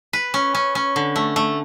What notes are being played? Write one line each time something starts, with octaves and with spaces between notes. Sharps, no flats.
B4
C#4
C#4
C#4
D3
A3
A3